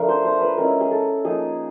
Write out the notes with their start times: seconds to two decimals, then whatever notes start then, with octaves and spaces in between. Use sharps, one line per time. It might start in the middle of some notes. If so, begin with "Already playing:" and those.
Already playing: F3 A3 D4 F4 A#4
0.09 C5
0.25 C5
0.41 B4
0.58 G#3 C#4 E4 A#4
0.81 G#4
0.91 A4
1.24 F3 A#3 D#4 G#4